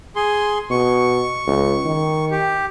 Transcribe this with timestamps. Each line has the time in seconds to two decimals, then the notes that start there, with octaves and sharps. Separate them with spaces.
0.16 G#4 C6
0.71 B2 C#6
1.47 C#2
1.85 D#3
2.31 G4